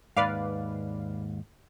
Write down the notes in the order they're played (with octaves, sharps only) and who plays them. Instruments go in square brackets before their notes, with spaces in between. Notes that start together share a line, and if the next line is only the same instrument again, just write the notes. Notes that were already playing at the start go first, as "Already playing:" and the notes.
[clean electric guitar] D#2 G#2 [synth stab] B4 D5 F5